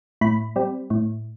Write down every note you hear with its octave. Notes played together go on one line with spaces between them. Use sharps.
A2 B5
G3 C4
A2